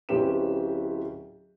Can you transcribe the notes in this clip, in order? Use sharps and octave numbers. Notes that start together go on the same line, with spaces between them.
D1 C4 C#4 G4 B4 E7